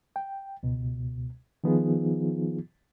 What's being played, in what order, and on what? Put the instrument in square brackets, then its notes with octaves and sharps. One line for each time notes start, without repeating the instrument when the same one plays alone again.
[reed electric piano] G5
C#2 B2
D#3 F3 B3 D#4 F4 G#4